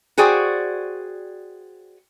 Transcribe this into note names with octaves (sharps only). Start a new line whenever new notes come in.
F#4 G#4 C5 D5 G5